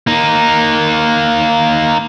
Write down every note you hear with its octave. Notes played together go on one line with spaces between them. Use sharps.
A#3 D#4